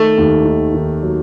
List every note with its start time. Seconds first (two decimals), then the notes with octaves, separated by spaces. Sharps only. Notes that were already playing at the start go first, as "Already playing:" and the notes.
Already playing: D#3 A3
0.17 D#2
0.45 D#3
0.74 D#3
1.03 F#3